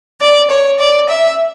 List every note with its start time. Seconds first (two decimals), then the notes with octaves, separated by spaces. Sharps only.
0.21 D5
0.50 C#5
0.79 D5
1.08 E5